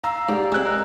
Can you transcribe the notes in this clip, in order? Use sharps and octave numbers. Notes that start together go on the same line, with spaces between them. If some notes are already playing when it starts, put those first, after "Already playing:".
F5 A#5 E6
G#2 G4 D5 F5
G#3 C4 E6 F#6
D#4 A#4